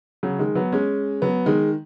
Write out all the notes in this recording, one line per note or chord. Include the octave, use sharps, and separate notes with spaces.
C#3 F#3
D#3 G#3
F#3 B3
G#3 C#4
F#3 B3
D#3 G#3